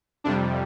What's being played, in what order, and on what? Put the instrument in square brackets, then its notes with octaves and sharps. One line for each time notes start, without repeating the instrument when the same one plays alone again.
[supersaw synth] F2 C3 G3 D4